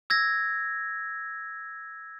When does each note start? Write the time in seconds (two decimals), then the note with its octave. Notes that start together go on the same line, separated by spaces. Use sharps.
0.10 E6 G#6 A#6